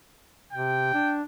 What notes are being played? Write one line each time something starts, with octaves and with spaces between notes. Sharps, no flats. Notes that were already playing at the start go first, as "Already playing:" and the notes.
C3 G5
D4